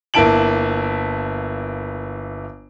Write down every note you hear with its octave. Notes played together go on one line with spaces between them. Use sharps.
G1 A#3 E4 A5 D7 F#7